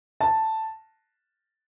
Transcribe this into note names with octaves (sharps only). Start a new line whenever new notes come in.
A5